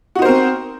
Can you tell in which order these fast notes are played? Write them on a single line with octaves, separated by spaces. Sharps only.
F#4 D#4 C5 A#4 C4